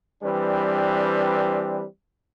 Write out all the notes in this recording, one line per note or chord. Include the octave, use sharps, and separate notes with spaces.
E3 G3 C4 D4 B4